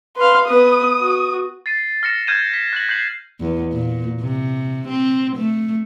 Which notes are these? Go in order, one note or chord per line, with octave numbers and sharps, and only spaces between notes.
B4 F5 C6
B3 B4 D#6
F#4
A6 C7 D#7
F6 A#6 C#7 E7
F6 G6 G#6 D#7 E7
B6
F#6 A#6 F#7
G6 C7 F#7
E2
A#2
C3
C4
A3